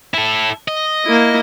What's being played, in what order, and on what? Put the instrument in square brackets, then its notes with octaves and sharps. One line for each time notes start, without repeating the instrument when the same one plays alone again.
[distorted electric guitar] E4 A4
D#5
[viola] A#3 E4